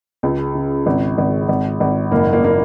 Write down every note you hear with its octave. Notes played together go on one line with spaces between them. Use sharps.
C#2 G#3
C#3
G#1
G#1
G#1
G#1
F#1 A#3
A#3
A#3